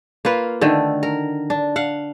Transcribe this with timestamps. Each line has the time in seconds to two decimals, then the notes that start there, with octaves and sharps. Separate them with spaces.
0.25 A#3 F4 B4
0.61 D3 D#3 A3
1.03 A#4
1.50 D4
1.76 F5 F#5